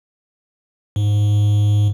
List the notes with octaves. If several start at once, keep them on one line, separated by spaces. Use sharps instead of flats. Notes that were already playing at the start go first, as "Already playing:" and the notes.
G#2